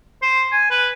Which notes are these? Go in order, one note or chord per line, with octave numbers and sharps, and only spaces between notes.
C5
G#5
B4